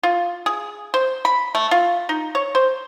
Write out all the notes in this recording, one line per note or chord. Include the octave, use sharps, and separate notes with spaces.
F4
G#4
C5
B5
A3
F4
D#4
C#5
C5